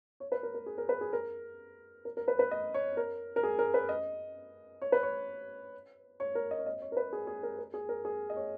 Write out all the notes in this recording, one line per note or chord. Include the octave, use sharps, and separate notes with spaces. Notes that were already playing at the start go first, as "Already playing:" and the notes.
C#5
B4
A#4
A#4
G#4
A#4
B4
G#4
A#4
A#4
A#4
B4
B4
D#5
C#5
A#4
A#4
G#4
A#4
B4
D#5
C#5
B4
C#5
C#5
A#4
D#5
C#5
D#5
C#5
A#4
B4
G#4
G#4
A#4
A#4
G#4
A#4
G#4
D#5
C#5